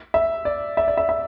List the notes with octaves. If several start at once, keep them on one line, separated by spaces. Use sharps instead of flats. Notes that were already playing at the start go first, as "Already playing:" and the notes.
E5
D5
E5
D5
E5
E5